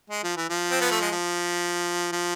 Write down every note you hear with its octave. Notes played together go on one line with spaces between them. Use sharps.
G#3
F3
E3
F3
C4
B3
A3
G#3
F3
F3